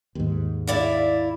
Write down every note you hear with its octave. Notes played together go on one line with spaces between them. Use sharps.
D#2 G#2
E4 D5 F5